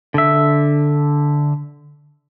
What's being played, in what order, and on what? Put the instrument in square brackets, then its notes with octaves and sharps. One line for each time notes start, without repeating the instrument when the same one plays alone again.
[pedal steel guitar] D3 E5